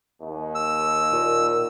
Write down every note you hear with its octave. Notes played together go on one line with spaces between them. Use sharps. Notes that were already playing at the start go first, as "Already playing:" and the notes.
D#2
E6
A#2